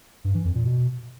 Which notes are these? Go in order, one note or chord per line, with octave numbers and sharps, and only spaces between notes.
G2
E3
F2
A#2
B2